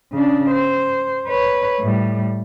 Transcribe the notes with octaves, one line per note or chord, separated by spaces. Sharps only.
C#3 D4
C5
B4 C#5
A2 G3